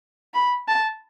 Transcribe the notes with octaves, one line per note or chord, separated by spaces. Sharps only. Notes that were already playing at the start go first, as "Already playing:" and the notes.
B5
A5